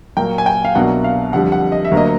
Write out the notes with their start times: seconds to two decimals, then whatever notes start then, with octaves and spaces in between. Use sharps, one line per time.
0.17 A#2 F#3 A#3 G5
0.38 G#5
0.46 G5
0.65 F5
0.75 C2 B2 F#3 A#3 D4 F#5
1.04 F5
1.33 F2 D3 G3 F#5
1.52 F#5
1.72 D#5
1.85 E5
1.91 D2 D3 F#3 A#3
1.97 D#5